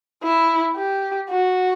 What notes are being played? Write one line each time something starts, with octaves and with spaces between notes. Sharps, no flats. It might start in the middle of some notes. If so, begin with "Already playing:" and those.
E4
G4
F#4